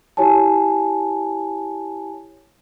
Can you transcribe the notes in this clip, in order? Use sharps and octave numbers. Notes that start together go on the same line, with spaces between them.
E4 G4 C#5 G#5 A5